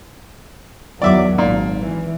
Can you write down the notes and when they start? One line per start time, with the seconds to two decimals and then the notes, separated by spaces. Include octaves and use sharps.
1.02 E2 D#3 F#3 D5 E5 D6
1.38 G#1 A#2
1.79 E3